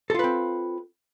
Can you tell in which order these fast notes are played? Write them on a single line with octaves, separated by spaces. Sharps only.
A4 F4 B4 C4